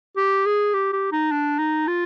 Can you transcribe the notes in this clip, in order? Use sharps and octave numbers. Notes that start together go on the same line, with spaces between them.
G4
G#4
G4
G4
D#4
D4
D#4
F4